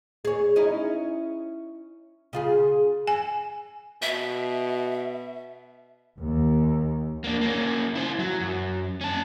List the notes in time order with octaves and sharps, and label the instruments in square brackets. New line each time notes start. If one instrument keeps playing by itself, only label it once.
[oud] G#4 C#5
C#4 D#4 E4
C#3 F4 G#4
[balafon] G#5
[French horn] B2 [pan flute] E5
[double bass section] D#2
[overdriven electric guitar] A#3 D4
A#3 C#4
E4 C5
F#3
F#2
C#4 A5